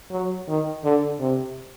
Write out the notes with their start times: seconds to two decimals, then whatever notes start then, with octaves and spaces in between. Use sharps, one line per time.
0.11 F#3
0.48 D#3
0.84 D3
1.20 C3